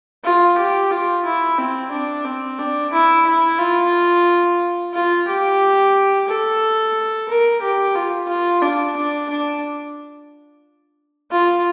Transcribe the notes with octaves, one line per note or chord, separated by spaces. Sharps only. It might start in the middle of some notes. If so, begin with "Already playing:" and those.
F4
G4
F4
E4
C4
D4
C4
D4
E4
E4
F4
F4
G4
A4
A#4
G4
F4
F4
D4
D4
D4
F4